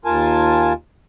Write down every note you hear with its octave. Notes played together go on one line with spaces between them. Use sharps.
D#2 F4 A#4 G#5 A5